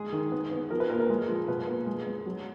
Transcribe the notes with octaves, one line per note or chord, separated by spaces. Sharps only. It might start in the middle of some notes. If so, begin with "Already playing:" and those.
Already playing: G#3 G#4
D#3
B3
B3
F3 A#4
B4
A#2 A#4
A#4
G#3
F3
B2 B4
A#3
G#3
B3
F#3